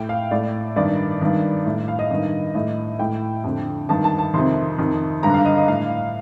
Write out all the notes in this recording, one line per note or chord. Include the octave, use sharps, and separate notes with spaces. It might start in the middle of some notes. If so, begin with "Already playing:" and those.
Already playing: A2 G5
F5
A2 D5
G2 D#3 D5
G2 D#3
A2
F5
D#5
G2 D#3
A2 D#5
A2 G5
F2 D3
G2 D#3 A5
A5
A5
F2 C3 D#3 C6
F2 D#3
G2 D3 A#5
F5
D#5
D#5
A2 F5